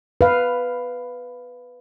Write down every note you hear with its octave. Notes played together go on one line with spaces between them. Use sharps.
B4 F5